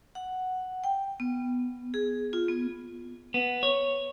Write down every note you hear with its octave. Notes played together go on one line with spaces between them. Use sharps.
F#5
G5
B3
G#4
F4
B3
B3
C#5